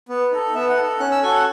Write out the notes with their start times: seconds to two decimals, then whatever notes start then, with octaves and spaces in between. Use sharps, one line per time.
0.09 B3
0.32 D#4 A4
0.54 B3 E5
0.69 F#5
0.77 D#4 A4
1.00 C#4 F#6
1.11 E6
1.23 F#4 A4 G#5
1.35 F#5